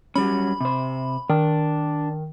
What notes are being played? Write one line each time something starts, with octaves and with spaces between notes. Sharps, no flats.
F#3 G3 C#4 B5
C3 C5
D#3 D4